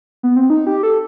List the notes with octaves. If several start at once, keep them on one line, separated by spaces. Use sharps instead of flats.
B3
C4
D#4
G4
A4